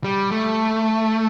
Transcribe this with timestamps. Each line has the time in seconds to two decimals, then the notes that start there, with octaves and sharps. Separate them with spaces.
0.04 G3
0.31 A3